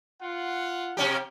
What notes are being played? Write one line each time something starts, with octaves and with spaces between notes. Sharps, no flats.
F4 F#5
C3 C#4 G4